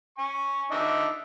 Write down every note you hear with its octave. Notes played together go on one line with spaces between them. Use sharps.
G#5 C#6
D4 D#4 E5